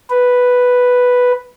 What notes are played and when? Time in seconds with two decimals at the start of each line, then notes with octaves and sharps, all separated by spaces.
0.10 B4